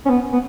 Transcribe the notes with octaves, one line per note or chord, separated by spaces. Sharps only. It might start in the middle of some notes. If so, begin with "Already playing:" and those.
C#4
B3
B3